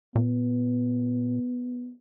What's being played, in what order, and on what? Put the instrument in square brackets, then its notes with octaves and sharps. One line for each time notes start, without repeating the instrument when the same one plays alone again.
[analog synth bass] A#2 [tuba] B3